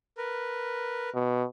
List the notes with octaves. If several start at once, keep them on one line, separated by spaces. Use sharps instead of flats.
A#4 B4
B2